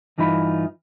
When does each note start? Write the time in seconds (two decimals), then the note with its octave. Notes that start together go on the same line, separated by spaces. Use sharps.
0.18 G2 E3 D#4 F4 B5